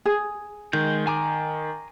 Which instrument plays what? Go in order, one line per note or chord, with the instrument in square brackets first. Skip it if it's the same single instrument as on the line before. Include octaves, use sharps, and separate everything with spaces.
[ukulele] G#4
[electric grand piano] D#3 [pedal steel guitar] G#3 G6
[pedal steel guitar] G#5 A#5 D6